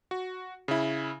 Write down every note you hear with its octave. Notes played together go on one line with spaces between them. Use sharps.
F#4
C#3 E4